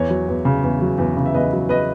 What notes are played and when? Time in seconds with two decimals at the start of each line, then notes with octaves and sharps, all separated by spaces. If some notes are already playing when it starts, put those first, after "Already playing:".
Already playing: E2 C#5
0.10 F#3
0.28 E2
0.45 C#3
0.64 E2
0.82 F#3
0.98 E2
1.17 C#3
1.26 E5
1.34 E2 B4 D#5
1.53 F#3
1.69 B4 D#5